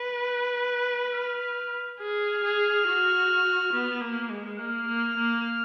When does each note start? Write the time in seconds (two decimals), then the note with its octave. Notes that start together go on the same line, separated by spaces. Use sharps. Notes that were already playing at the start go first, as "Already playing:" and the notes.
Already playing: B4
0.28 F#6
1.14 F6
2.00 G#4 F6
2.44 G#4
2.86 F#4
3.73 B3
4.01 A#3
4.30 G#3
4.59 A#3 F6
4.88 A#3
5.17 A#3